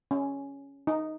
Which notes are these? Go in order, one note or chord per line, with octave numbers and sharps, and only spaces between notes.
C#4
D#4